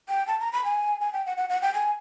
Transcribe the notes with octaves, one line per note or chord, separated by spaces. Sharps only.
G5
A5
A#5
B5
G#5
G#5
G5
F#5
F#5
F#5
G5
G#5